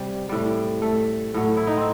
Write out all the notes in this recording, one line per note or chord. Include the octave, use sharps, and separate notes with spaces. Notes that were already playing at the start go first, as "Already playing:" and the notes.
Already playing: C3 G3
A2 G3
A3
A2 F#3
E4
D#4
C4